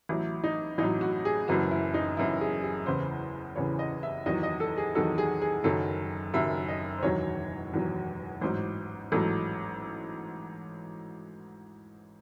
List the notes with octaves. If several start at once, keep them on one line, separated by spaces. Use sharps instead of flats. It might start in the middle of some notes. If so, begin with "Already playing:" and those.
A1 A2 F#3 E4
D#4
A1 A2 F#3 D#4
F#4
G#4
F#1 F#2 E3 F#4
E4
D#4
F#1 F#2 E3 E4
G#4
G#4
F#1 E2 C#3 E3 C5
F#1 E2 C#3 E3 C#5
D#5
E5
E2 D#3 F#3 D#5
D#5
A4
G#4
E2 D#3 F#3 A4
G#4
G#4
F#1 F#2 D#3 F#3 A4
F#1 F#2 D#3 F#3 E5
D#5
C5
E1 E2 D#3 F#3 C#5
E1 E2 D#3 F#3
A1 G#2 F#3 C5
A1 G#2 F#3 A4